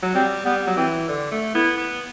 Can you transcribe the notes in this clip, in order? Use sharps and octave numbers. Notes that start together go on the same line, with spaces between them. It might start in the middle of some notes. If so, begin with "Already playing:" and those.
F#3
G3 C4
G3 B3
F#3
E3 C4
D3
A3
B3 E4
B3